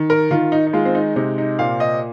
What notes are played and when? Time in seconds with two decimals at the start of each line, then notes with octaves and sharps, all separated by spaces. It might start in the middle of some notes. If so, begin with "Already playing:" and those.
Already playing: D#3
0.10 A#4
0.31 D#3 F4
0.52 D#4
0.67 D#4
0.73 G#3 F4
0.85 C4
0.95 D#4
1.16 C3 D#4
1.38 D#4
1.59 A#2 F5
1.80 D#5